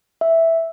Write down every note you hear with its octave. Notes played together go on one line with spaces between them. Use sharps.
E5